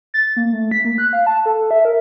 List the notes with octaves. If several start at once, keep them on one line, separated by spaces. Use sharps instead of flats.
A6
A#3
A3
B6
A#3
F#6
F5
A5
A4
E5
A#4